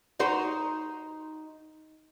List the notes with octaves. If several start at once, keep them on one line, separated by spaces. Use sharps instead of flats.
D#4 F#4 C5